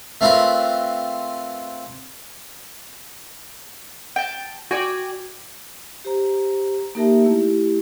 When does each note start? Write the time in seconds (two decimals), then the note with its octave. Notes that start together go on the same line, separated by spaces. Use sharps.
0.21 A3 C4 F4 A#4 B4
4.16 G5 A5
4.71 F#4 D5 G5 G#5
6.04 G4 C5 A#5
6.95 A#3 D#4 G4 A#4 E5 A5
7.24 A3 E4 G4